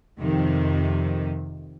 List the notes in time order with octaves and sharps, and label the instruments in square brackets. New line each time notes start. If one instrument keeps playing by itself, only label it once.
[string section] F2 C3 D#3